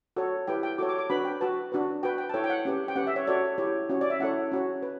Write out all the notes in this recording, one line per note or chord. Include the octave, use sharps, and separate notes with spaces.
F#4 A4 C#5
E4 G4 B4 G5
G5
F#4 A4 C#5 D6
D6
D6
D4 F#4 B4 B5
G5
F#4 B4 A5
D4 F#4 B4
F#4 B4 G5
G5
A5
E4 A4 C#5 G5
G5
F#5
C#4 G4 B4
G5
C#4 G4 B4 F#5
E5
C#5
F#4 A4 C#5 D5
E4 G4 C#5
C#4 F#4 C#5
D5
E5
C#4 E4 A4 C#5 F#5
C#4 F#4 C#5
B4